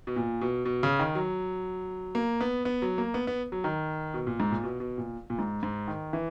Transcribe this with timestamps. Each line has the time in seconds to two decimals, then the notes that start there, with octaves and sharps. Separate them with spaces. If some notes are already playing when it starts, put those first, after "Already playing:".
0.07 B2
0.16 A#2
0.41 B2
0.65 B2
0.83 C#3
0.99 D#3
1.15 F#3
2.15 A#3
2.41 B3
2.65 B3
2.82 F#3
2.98 A#3
3.14 B3
3.27 B3
3.52 F#3
3.64 D#3
4.14 B2
4.27 A#2
4.40 G#2
4.51 A#2
4.63 B2
4.80 B2
4.98 A#2
5.30 A#2
5.39 G#2
5.63 G#2
5.88 D#3
6.13 E3